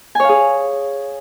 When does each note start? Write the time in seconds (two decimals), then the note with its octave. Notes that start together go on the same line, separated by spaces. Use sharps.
0.15 G#5
0.20 C#5
0.24 F5
0.29 G#4